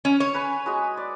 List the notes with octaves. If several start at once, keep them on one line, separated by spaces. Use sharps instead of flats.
C#4
C#5
B4 G#5 B5
G#3 F#4 D#6
D5